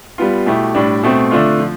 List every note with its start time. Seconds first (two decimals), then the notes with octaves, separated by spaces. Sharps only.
0.18 G3 B3 F4
0.46 B2 A3 E4 G4
0.75 A2 G3 D4
1.03 B2 A3 C4
1.31 D3 A3 D4 F4
1.59 F3